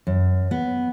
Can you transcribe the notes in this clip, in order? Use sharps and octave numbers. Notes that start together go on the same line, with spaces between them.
F#2
B3